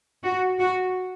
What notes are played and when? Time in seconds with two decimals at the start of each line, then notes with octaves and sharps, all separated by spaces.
0.24 F#4
0.59 F#4